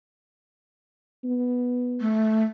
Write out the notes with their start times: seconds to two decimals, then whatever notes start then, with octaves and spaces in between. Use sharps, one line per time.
1.24 B3
2.01 A3